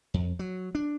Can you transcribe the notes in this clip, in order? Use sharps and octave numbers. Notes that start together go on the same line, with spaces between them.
F2
F#3
D4